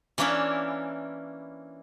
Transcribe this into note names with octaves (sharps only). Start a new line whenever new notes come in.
E3 A#3 C#4 D4 E4